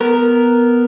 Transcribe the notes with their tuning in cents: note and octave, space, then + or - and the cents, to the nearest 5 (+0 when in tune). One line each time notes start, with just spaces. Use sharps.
B3 +0 A#4 +0